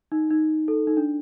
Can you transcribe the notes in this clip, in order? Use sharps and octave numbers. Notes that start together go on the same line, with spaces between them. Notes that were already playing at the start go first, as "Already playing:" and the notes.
D#4
D#4
A4
D#4
D4